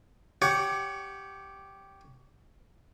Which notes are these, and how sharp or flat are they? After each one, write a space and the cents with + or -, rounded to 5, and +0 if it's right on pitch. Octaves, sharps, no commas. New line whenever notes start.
G4 +0 C#5 +25 F#5 +0